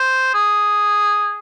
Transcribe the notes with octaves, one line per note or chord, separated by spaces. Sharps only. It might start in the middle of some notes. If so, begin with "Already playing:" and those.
Already playing: C5
G#4